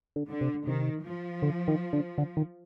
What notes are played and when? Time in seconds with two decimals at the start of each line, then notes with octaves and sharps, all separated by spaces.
0.16 D3
0.28 D3
0.41 C3
0.66 C3 D#3
1.04 F3
1.42 D3
1.68 D#3
1.93 D3
2.18 D3
2.37 D#3